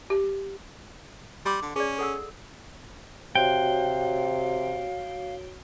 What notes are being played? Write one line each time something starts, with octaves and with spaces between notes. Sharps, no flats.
G4
G3 C6 D6
D3
C#4 G#4 D5
A4 F#5 E6
C3 F#4 C#5 F5 G5